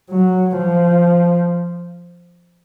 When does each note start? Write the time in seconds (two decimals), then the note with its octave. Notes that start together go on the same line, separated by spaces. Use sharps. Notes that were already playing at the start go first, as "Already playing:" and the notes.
0.11 F#3
0.56 F3